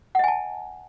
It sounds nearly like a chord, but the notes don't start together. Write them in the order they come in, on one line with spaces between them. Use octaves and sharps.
F#5 D#5 G#5 A5